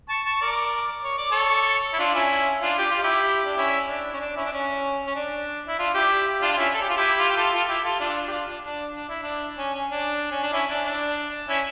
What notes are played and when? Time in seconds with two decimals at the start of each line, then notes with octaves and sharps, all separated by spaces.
0.09 A5 C#6
0.25 A5 C#6
0.41 A#4 D5
1.04 C#5
1.18 D5
1.31 A4 C#5
1.93 E4
1.99 D4 F4
2.15 C#4 E4
2.62 D4 F4
2.78 G4
2.91 F4
3.03 E4 G4
3.46 D4
3.57 C#4 E4
3.88 D4
4.13 C#4
4.21 D4
4.36 C#4 E4
4.45 D4
4.52 C#4
5.07 C#4
5.16 D4
5.68 E4
5.78 D4 F4
5.94 E4 G4
6.42 D4 F4
6.53 F4
6.57 C#4 E4
6.74 A4
6.82 G4
6.89 F4
6.97 E4 G4
7.19 F4
7.29 G4
7.37 F4 A4
7.53 F4 A4
7.68 E4 G4
7.84 F4 A4
8.00 D4 F4
8.28 G4
8.32 D4 F4
8.47 D4
8.64 D4
8.95 D4
9.09 E4
9.23 D4
9.58 C#4
9.74 C#4
9.90 D4
10.31 C#4
10.43 D4
10.53 C#4 E4
10.69 D4
10.85 D4
11.48 C#4 E4